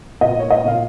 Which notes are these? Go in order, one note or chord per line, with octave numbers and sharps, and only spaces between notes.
A#2 D#5
C#5
D#5
A#2 F5